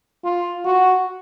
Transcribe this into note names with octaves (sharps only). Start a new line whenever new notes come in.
F4
F#4